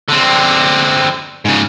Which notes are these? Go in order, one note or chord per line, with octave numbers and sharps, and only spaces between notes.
D3 C4
G#2 C#3